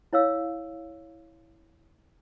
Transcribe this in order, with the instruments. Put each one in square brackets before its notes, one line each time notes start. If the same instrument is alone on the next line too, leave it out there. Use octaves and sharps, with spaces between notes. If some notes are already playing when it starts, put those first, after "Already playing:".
[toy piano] E4 C#5 F5 E6